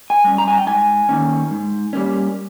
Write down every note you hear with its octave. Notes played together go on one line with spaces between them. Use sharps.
G#5
G3 C#4
A#5
G#5
G5
G#2 G#5
D#3 A#3 C#4
G#2
G3 A#3 C#4